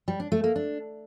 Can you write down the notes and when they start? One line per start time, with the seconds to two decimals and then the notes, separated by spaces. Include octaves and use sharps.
0.08 G3
0.20 D4
0.32 A3
0.44 A#3
0.56 D4